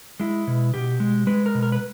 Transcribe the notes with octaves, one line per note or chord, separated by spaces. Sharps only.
G#3 E4
B2
B2 G4
G#3
G#3 B4
A#4
B2
A#4
B4